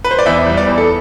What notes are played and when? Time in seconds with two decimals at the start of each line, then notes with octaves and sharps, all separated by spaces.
0.05 B4
0.11 C5
0.19 D5
0.26 E2 E5
0.47 G3
0.57 D5
0.67 E2
0.78 A4